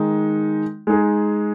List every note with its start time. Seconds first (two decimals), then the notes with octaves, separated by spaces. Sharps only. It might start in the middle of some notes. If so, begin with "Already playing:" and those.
Already playing: D#3 G#3 D#4
0.87 G#3 D#4 G#4